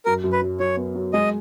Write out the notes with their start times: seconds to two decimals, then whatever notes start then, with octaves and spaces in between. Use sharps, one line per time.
0.06 F#2 A#4
0.24 F#2
0.32 B4
0.42 F#3
0.60 F#3 C#5
0.77 B3
0.95 F#3
1.13 G#3 D#5